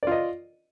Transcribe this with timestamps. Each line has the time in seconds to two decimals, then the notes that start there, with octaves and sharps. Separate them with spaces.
0.03 D5
0.07 F4
0.11 D#5